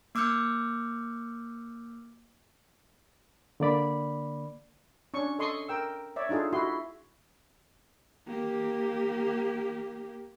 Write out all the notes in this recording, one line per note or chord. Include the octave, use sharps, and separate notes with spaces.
A#3 D6 E6 F6 G6 C#7
D3 A#3 D5 B5
C#4 D4 C#6
A4 D#5 C6 C#6 D#6
A#4 G5 E6
C#5 D5 E5
D4 D#4 F4 G#4 A4
E4 F#4 C6
A#3 G4